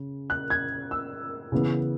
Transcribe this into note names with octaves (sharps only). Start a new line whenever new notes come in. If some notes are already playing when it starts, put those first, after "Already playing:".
Already playing: C#3
F#6
G#6
E6
C#3 E3 B3